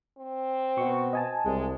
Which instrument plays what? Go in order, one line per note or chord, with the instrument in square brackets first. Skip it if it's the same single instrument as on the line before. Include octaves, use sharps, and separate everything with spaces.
[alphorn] C4
[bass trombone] B2 [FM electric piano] C#6
[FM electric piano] D#5 G#5 A5
[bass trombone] C2 [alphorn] G#3